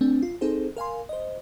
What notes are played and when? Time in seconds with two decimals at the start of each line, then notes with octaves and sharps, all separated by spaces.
0.01 A3 C4 D4
0.23 F4
0.41 C4 D#4 G#4 A4 C5
0.77 A#4 F5 G#5 C6
1.09 C5 D#5